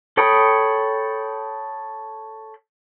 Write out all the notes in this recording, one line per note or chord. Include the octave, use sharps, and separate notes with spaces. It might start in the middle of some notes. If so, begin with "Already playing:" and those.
A4 C#5 G5 B5 D#6